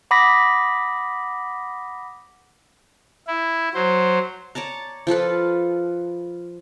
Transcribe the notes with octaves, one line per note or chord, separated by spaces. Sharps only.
F#5 B5 D6 D#6 A#6 B6
E4
F#3 C5
C#5 D5 A5 A#5
F3 F4 A4 B4